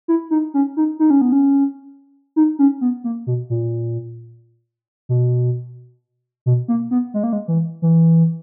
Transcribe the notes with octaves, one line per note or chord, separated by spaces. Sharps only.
E4
D#4
C#4
D#4
D#4
C#4
B3
C#4
D#4
C#4
B3
A#3
B2
A#2
B2
B2
A#3
B3
G#3
A#3
G#3
E3
E3